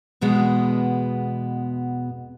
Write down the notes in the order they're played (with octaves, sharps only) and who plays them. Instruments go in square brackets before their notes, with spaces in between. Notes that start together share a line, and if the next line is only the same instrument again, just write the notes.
[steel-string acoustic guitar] E2 B2 G#3 B3